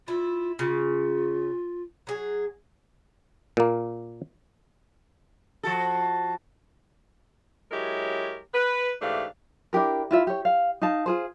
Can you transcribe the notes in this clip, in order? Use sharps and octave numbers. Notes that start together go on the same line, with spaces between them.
E4 F4
C#3 F4
F#3 G#4
A#2 A#3
F3 F#4 A4
F#3 G#3 E4 G4 A#4 C#5
B4
G#2 E3 A3 D4 G4 F5
D4 E4 G4 A#4
E4 F4 E5
G4 C#5
F5
D#4 D#5 F5 A5
F4 G#4 C5